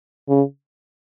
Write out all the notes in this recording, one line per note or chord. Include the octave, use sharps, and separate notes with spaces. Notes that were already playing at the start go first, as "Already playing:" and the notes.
C#3